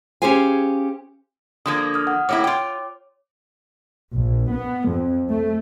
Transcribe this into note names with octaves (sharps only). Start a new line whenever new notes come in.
C#4 G4 G#4 C5 F5 G#5
D3 F3 A#3 D#6 G#6
D#6 F6
F#5
A2 A#3 E4 C#5 D6
F4 G5
A#1
B3
F2
A3